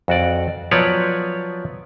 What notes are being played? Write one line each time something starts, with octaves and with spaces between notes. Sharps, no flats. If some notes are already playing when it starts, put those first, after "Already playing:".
F2 F#4 D5
F3 F#3 B3 B4 C#5 D5